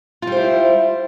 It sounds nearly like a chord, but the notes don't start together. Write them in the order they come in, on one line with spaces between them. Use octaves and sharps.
F4 G3 C5 E4